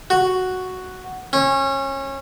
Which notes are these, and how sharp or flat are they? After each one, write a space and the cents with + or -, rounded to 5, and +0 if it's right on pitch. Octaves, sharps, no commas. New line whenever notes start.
F#4 +0
C#4 -25